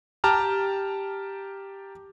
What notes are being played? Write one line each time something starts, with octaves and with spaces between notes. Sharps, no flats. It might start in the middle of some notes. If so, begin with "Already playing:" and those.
G4 G5 A5 A#5 F6